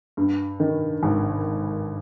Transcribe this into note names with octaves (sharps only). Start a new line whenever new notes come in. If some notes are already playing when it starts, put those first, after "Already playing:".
G2
D#3
G#1